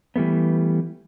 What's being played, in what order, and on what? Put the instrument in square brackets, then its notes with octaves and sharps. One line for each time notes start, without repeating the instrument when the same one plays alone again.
[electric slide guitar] E3 G3 A3 B3